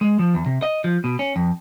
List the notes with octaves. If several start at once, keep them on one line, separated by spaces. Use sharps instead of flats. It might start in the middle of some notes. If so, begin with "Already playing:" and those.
G#3
F3
E2
C3
D#5
F3
B2
C#4
F2